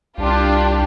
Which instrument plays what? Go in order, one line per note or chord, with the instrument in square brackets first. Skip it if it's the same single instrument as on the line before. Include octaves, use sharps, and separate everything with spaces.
[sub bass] C2 [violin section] D4 F4 G4